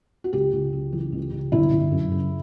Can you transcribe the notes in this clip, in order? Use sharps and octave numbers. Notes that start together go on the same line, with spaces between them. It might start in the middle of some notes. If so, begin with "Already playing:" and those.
F#4
C#2 G4
C#2
C#3
E3
C#2
C#2
G1 E4
G1
F#2
C#3